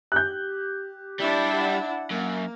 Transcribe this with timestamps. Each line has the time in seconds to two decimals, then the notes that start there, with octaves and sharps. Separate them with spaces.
0.12 G4 F#6 G6
1.20 G3 D4 E4
1.53 F#5
2.11 F#2 A#3